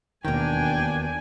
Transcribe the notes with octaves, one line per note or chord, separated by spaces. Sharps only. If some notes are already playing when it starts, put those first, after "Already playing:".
E1 D#2 B2 D#3 A#3 D4 G5 G#5